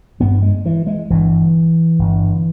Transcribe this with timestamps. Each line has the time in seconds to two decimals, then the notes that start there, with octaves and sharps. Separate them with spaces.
0.20 G1 G2 B3
0.42 G#3
0.66 E3
0.87 G#3
1.10 G1 G2 E3
1.99 G1 G2